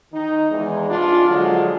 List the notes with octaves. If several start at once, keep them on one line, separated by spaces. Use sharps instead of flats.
D#3 D#4
E2 E3 G#3
C2 D4 F4
D3 F3 F#3 G#3